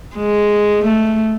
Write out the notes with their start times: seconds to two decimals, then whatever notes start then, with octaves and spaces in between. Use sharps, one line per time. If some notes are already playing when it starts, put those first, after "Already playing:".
0.16 G#3
0.84 A3